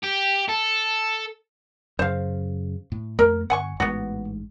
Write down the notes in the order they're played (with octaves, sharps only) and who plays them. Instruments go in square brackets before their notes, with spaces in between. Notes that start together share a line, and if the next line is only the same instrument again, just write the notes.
[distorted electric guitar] G4
A4
[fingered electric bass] F#2 C#3 [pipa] C5 F5
[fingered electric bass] A2
[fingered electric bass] F2 A3 A#3 [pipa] A#4
[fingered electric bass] G1 [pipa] F#5 G#5 C#6
[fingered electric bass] A1 G#2 [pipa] B3 F#4